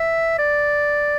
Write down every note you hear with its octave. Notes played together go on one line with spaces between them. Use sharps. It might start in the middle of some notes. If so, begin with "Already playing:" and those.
Already playing: E5
D5